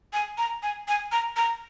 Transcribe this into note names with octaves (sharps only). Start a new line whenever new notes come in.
G#5
A#5
G#5
G#5
A#5
A#5